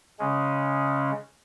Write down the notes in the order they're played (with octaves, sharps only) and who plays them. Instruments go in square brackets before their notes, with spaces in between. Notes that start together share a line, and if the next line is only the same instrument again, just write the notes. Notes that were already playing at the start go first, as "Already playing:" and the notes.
[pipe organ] C#3 G#3 C#4